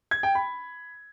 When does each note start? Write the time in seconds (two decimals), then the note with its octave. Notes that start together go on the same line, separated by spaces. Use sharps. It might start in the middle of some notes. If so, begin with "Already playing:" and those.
0.11 G#6
0.23 G5
0.35 B5